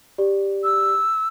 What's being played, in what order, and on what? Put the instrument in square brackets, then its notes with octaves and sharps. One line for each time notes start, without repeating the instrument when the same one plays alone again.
[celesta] G4 D5
[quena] E6